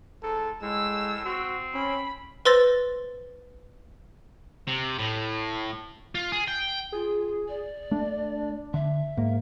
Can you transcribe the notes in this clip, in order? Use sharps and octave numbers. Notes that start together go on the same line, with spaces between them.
G#2 A4
A2 G#3 E6
C4 F#4
C#4 B5
B4 C5 C6 E6 A6 A#6
C3
A2
F4
G#4
G5
F4 G#4
D5
A3 D4
D3 E5
G#2 A#3